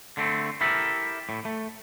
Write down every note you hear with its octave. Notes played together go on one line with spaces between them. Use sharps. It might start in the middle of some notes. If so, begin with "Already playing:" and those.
D3 A3 C4
E4 G4 A4 A#4 E5
A2
A3